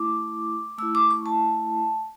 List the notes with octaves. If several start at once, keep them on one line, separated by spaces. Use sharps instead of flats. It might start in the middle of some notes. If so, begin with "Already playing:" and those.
Already playing: A3 E4 D6
A3 E4 E6
D6
C#6
A5